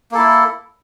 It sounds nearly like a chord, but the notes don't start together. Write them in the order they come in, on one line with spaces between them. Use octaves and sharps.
A#3 A4 E4